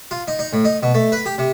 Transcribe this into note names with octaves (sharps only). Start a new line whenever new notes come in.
F4
D#4
D#4
A2
D#4
B2
A3
B4
G4
C3